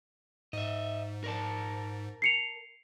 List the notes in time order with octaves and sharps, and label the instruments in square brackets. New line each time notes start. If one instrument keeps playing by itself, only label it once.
[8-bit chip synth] G#2 [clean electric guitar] D#5 E5
[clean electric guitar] A#4 D5 A5
[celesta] C7 C#7 F7